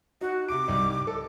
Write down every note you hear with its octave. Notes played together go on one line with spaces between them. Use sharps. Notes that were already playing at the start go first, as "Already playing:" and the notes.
D#4 F#4
C3 D6 D7
C2 G3 D#4
A4